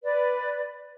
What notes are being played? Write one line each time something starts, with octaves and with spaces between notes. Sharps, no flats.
B4 D5